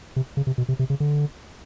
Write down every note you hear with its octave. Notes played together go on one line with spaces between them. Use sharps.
C3
C#3
C3
B2
C3
C3
C#3
D3